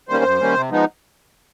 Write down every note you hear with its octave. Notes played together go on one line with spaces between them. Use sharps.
D#3 G3 A#3 C#4 C5
F#2
D#3 G3 A#3 C#4
C3
F3 G#3 B3 D#4